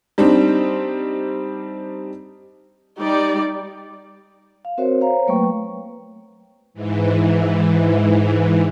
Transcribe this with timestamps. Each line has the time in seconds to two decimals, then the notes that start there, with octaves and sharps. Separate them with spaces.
0.18 G3 C4 D4 D#4
2.99 G3 D#4 G4 D5
4.65 F5
4.78 C4 F#4 A#4 C5 C#5 E5
5.01 C5 C#5 F5 A#5
5.27 F#3 A3 A#3 B4 G5 C#6
6.74 G#2 E3